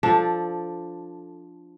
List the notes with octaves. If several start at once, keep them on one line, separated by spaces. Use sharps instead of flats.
F3 D4 A4